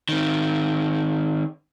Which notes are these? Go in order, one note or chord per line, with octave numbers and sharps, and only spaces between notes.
D#3 C4